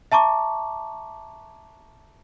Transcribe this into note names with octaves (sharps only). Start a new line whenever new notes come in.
E5 A5 A#5 C#6 D6